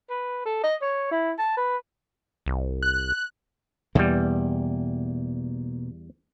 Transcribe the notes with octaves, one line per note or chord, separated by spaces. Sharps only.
B4
A4
D#5
C#5
E4
A5
B4
C2
F#6
E2 B2 G3 A#3